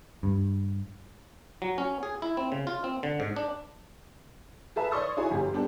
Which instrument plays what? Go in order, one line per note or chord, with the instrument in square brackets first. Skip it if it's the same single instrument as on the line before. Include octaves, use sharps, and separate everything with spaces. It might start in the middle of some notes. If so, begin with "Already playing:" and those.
[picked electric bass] G2
[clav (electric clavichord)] F#3
C#4
G#4
E4
C4
C#3
F4
C4
D3
G#2
D4
[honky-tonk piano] G#4 A4 B4 E5 A5
C#5 D5 C6 C#6 D#6 A6
D#4 E4 F#4 G#4 C#5 G#5
G1 G4
G3 B3 D4 G4 A4